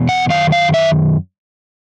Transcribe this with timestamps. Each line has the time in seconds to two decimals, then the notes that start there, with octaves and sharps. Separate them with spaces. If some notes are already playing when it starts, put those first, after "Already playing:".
Already playing: E2 B2
0.09 F#5
0.30 F#2 D#3 F5
0.52 F5
0.74 E5